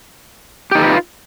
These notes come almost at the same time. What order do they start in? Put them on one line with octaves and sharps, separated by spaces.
G4 D#4 A4 B4 F4